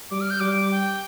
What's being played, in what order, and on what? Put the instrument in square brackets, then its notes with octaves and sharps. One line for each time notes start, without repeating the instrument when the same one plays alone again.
[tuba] G3 [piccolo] D6
[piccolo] F6
G6
[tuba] G3 [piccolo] D6
[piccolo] G5